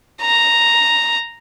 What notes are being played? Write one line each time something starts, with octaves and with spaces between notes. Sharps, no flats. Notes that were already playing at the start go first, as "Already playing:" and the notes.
A#5